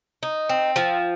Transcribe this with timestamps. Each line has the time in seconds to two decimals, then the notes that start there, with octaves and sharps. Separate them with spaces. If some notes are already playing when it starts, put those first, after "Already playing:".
0.23 D#4
0.49 C4
0.76 F3